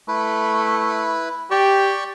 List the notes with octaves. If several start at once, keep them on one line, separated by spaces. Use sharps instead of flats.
A3 E4 B4
G4 D5 G5 C#6